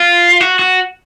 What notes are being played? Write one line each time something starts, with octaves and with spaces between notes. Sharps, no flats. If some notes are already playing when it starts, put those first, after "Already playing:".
Already playing: F4
F#4
F#4